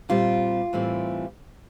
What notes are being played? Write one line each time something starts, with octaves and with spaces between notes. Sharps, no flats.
A#2 G3 C4 F4
A2 E3 G3 C4